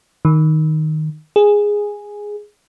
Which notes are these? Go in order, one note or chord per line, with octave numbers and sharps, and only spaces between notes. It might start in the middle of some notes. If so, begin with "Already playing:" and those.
D#3
G#4